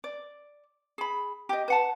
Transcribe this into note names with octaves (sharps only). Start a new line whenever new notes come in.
D5
G#4 B5
G4 D#5
B4 F#5 A5